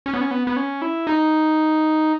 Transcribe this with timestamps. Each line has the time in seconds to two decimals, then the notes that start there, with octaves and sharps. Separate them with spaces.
0.06 C#4
0.14 B3
0.21 C#4
0.31 B3
0.47 B3
0.56 C#4
0.82 E4
1.07 D#4